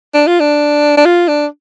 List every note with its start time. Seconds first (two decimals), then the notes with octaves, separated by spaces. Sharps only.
0.14 D4
0.27 F4
0.40 D4
0.97 D4
1.05 F4
1.28 D4